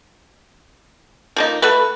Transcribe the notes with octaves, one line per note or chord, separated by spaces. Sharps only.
F3 A#3 D#4
A3 F#4 B4